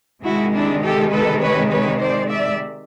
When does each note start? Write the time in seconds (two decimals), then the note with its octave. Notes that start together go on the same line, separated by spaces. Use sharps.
0.24 C3 D#3 G#3 E4 F#4
0.54 D4 E4
0.83 G4 A4
1.12 A4 B4
1.41 B4 C#5
1.71 B4 C#5
2.00 C5 D5
2.29 D5 E5